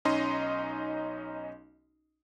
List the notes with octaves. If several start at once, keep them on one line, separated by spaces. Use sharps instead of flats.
B1 C#4 D#4 D#5 C6